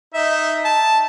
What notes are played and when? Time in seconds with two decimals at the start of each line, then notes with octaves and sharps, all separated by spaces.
0.14 D#4 E5
0.65 A5